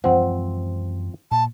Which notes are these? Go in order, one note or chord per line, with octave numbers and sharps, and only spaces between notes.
F#2 E3 F3 G#3 C4 C5 F#5
A#2 A5